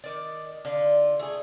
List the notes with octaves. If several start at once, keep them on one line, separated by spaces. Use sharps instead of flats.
D#3 D5
D3 F4
A3 G#4